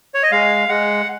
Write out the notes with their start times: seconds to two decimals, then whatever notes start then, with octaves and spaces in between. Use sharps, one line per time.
0.14 C#5
0.23 D#5
0.32 G#3 F5
0.68 G#3 F#5